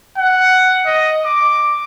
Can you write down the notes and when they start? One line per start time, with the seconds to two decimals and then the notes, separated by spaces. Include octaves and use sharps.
0.17 F#5
0.86 D#5
1.26 D6